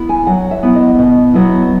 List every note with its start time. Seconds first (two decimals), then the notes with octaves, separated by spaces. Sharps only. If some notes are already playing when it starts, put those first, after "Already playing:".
Already playing: B3 E4
0.09 G#5
0.27 F#3 F#5
0.51 E5
0.63 B3 E4
0.75 D#5
0.99 B2
1.34 F#3 B3 E4